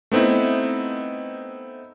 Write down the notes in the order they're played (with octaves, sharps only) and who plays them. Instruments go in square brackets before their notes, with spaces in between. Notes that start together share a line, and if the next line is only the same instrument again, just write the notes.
[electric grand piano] A3 B3 C4 D#4 E4